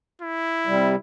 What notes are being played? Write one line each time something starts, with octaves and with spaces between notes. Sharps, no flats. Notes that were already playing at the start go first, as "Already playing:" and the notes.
E4
C3 G3